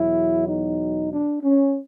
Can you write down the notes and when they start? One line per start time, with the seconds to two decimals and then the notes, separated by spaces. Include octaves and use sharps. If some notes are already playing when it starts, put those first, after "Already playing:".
Already playing: E2 B2 F#3 E4
0.48 D#4
1.12 D4
1.43 C#4